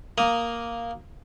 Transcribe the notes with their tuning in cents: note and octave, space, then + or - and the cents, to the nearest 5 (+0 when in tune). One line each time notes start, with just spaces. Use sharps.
A#3 +0 A#5 +0 D#6 +0